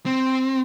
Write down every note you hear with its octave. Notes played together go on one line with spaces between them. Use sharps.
C4